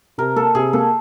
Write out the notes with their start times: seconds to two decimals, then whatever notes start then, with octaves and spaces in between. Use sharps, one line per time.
0.18 C3 A#4
0.36 A#3 A4
0.55 C3 G#4
0.73 A#3 A4